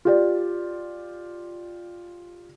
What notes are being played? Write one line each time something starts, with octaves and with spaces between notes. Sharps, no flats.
F4 G4 D5